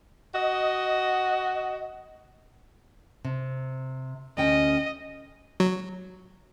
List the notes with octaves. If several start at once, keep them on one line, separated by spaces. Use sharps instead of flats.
F#4 D#5
C3
D2 C#4 D#5 G5
F#3